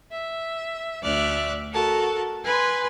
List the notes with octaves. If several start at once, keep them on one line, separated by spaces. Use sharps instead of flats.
E5
D2 A3 D5 E5 F6 F#6
F#4 A4 A#4 A5
B4 G#5 B5 C6